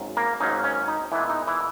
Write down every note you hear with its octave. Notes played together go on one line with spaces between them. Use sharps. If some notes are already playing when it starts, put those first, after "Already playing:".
Already playing: G#1 G#2 F#3 C#4
A#3 A#4
G#1 G#2 F#3 A#3 C#4 D#4
C#4
D#4
A#2 E3 G#3 B3 E4
D#4
E3 E4